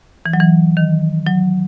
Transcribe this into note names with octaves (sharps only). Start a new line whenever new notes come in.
E3
F#3
E3
D#3
F#3